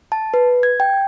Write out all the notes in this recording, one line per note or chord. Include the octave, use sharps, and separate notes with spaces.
A5
B4
G#6
G5